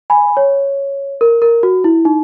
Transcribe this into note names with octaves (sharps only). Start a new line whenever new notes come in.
G#5 B5
C#5
A#4
A#4
F#4
E4
D#4